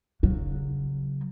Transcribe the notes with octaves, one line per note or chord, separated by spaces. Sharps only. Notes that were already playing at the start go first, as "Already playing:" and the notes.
C#3 F#3